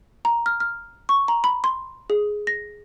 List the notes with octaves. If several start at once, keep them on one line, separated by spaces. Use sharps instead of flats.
A#5
F6
F6
C#6
A#5
B5
C6
G#4
A#6